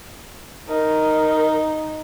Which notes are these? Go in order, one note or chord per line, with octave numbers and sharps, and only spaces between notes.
D#4 A#4